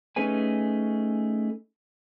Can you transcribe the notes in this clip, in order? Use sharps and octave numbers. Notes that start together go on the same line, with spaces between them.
A3 C#4 D#4 G#4 B4 G#5